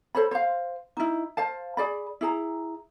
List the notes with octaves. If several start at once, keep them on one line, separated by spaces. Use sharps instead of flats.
A4 C5 C#5 B5
C5 F5
D#4 E4
C5 F5 A5
G#4 D5 B5
E4 G#4 A#5